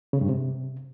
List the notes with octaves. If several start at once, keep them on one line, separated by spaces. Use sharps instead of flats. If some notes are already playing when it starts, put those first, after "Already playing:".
C#3
G2
C3